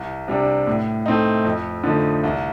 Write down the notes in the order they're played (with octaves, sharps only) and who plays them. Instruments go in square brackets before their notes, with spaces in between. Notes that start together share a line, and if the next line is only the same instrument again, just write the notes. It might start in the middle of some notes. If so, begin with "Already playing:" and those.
Already playing: [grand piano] C2
C3 G3 D4
A2
A3 C4 D#4
F2
D3 F3 A3 D#4
C2